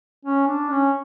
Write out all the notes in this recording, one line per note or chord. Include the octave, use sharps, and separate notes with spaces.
C#4
D4
C#4